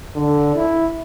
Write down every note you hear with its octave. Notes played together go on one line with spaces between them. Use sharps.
D3
E4